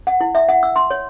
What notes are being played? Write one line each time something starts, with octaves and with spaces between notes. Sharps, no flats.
F#5
E4
E5
F#5
E6
C6
C#5